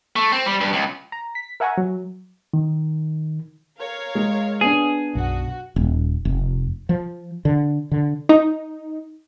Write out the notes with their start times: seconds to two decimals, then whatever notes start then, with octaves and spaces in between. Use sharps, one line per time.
0.16 A3
0.32 C4
0.46 G3
0.61 G2
0.73 C#2
1.12 A#5
1.35 B6
1.60 A#4 E5 F#5 G#5 A#5 C#6
1.78 F#3
2.54 D#3
3.79 A#4 C#5 F5
4.15 G#3
4.61 B3 D4 G#4
5.15 B1 F#2 F#4
5.76 D#1
6.25 F1
6.89 F3
7.45 D3
7.91 D3
8.29 D#4